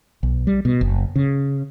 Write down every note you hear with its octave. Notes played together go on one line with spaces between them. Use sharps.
B1
G3
B2
F#1
C#3